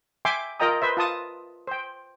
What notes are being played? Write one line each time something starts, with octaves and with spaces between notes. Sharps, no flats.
E5 G5 G#5 C6 D6
F4 A#4 D#5 G5 A#5 D#6
B4 C5 E5
F4 A5 D#6
C5 G5